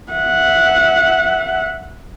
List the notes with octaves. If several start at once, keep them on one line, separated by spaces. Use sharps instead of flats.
E5 F#5